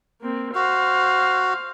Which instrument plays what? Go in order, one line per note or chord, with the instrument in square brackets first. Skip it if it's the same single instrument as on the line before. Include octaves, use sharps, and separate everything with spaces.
[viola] A#3 C4
[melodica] F#4 [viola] C5 F5